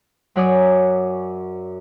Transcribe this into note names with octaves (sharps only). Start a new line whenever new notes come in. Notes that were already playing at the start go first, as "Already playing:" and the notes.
F#2 F#3 C#5 D5 G#5 D#6